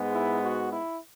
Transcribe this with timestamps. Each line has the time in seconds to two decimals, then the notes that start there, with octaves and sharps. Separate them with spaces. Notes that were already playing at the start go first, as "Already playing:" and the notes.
Already playing: G#2 G#3 B3
0.14 E4
0.43 F#4
0.73 E4